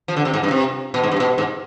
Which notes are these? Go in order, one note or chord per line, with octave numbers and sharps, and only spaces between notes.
F3
D3
C3
G#2
G2
C3
B2
G#2
G2
B2
G#2